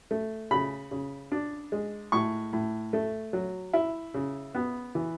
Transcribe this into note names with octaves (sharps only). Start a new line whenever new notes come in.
A3
C#3 B5
C#3
D4
G#3
A2 C#6
A2
A3
F#3
E4
C#3
B3
E3